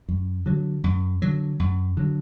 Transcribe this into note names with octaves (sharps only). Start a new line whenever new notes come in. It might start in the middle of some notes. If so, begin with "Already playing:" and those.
F#2
D3 F#3
F#2
D3 F#3
F#2
D3 F#3